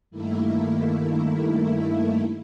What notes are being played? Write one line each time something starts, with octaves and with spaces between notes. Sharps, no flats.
G2 D#3 A3 A#3 E4